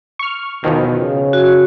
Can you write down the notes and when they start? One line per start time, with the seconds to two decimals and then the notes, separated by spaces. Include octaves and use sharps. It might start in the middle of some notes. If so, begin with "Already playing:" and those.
0.19 C#6 F6
0.63 E2 B2 D#3 F3
0.99 C#3
1.33 F#4